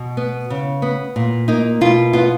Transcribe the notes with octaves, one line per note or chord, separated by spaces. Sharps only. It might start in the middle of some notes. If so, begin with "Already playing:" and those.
Already playing: B2
B3
C#3
B3
A#2
A#3 D#4
B2 F4
B3 F4